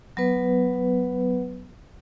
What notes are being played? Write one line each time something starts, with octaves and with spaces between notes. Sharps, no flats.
F#3 B3 B4